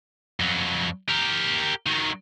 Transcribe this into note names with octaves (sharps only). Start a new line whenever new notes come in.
F2 F#3
G4 A#4
D#3 F#3